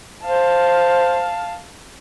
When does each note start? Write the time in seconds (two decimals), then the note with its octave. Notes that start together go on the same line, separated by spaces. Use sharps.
0.24 C5 F5 A5